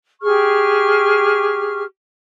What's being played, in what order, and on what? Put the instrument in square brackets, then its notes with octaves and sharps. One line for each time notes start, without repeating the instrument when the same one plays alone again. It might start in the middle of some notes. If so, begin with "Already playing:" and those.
[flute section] G4 G#4 C#6 F6